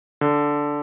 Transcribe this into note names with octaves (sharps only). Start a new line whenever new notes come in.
D3